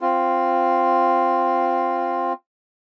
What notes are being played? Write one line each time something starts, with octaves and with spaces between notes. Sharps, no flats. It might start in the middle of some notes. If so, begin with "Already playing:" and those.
C4 F4